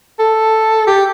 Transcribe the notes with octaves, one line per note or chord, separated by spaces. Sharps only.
A4
G4